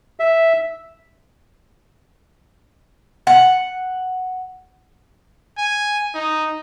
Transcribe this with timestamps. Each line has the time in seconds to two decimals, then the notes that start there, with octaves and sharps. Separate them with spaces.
0.20 E5
3.27 F#5
5.58 G#5
6.15 D#4